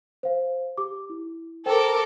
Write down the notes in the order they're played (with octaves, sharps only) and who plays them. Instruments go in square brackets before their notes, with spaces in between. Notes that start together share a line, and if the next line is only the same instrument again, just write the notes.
[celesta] C5 F5
G4 D6
E4
[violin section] A4 A#4 D6 [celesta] C5 G5